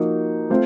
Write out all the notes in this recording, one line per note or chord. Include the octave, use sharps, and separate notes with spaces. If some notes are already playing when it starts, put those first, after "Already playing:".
Already playing: F3 A#3 D#4 F#4
A3 C4 F4 C5